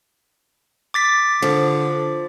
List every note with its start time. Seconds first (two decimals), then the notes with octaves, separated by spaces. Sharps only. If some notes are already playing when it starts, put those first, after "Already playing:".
0.94 D6 A6 B6
1.42 D3 F3